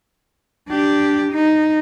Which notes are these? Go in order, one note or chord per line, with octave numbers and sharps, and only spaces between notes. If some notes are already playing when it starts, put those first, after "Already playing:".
D4 G4
D#4